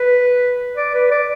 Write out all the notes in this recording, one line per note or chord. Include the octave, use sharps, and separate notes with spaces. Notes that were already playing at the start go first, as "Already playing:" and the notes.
Already playing: B4
D5
B4
D5